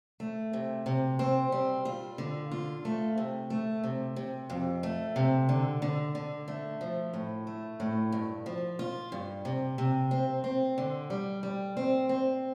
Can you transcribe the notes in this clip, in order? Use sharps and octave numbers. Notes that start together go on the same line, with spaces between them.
A3
C3
C3
C4
G3
F4
D3
F4
A3
C3
A3
C3
C3
F2
A3
C3
D3
D3
D3
A3
F3
A2
A3
A2
G2
F3
F4
G2
C3
C3
C4
C4
D3
G3
G3
C4
C4